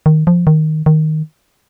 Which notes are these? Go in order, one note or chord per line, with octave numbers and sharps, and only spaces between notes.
D#3
F3
D#3
D#3